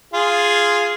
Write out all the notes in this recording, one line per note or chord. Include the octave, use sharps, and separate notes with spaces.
F4 G#4